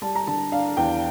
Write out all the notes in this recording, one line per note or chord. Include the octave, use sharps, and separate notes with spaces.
G3 A5
A#5
D3 A5
D4 F5
E2 G5